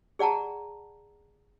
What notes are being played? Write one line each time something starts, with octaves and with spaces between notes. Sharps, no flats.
G#4 D5 F#5 A5 A#5